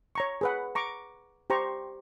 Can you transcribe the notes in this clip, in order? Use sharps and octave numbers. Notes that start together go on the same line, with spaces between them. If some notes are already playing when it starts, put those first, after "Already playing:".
C#5 A#5 C#6
G#4 B4 F#5
A#5 C#6 D6
G4 C5 A#5 C#6